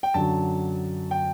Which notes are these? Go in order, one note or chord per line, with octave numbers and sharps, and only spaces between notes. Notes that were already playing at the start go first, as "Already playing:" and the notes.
G5
F#2 D3 F#3 A5
G5